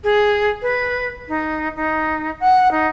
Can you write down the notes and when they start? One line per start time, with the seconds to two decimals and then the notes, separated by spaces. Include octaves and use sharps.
0.03 G#4
0.62 B4
1.28 D#4
1.76 D#4
2.40 F#5
2.71 D#4